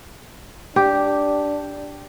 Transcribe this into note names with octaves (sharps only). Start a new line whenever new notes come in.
D4 G4